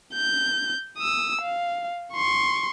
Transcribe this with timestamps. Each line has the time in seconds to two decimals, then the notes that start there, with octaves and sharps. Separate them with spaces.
0.14 G6
0.97 D#6 E6
1.41 F5
2.14 C6 C#6